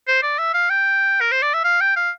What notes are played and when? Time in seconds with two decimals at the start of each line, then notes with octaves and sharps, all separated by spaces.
0.08 C5
0.23 D5
0.39 E5
0.54 F5
0.70 G5
1.21 A#4
1.32 C5
1.42 D5
1.54 E5
1.64 F5
1.81 G5
1.96 F5